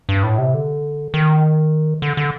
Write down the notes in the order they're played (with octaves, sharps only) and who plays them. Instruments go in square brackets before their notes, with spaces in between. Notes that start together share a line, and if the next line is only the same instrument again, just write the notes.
[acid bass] G2
A2
C3
D3
D#3
D3
D3